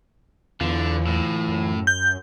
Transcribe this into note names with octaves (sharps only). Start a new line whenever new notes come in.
E2 D3 E3 F4
A2
F#2
G6